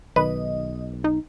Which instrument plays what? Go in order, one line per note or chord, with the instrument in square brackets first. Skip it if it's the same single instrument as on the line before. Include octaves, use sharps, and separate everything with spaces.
[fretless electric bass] B1 [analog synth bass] D#3 [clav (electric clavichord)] B4 [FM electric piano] D#5
[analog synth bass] D#4